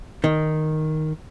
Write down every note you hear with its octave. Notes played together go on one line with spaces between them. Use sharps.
D#3